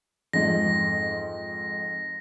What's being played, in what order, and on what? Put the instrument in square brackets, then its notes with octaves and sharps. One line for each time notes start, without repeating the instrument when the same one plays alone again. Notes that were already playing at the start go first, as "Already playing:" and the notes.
[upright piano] F2 G#2 [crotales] A#6